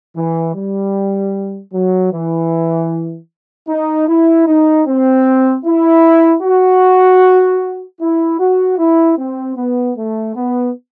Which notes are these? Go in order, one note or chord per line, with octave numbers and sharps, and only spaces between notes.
E3
G3
F#3
E3
D#4
E4
D#4
C4
E4
F#4
E4
F#4
E4
C4
B3
A3
B3